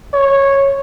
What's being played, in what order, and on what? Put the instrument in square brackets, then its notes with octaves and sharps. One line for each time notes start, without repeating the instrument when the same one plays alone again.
[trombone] C#5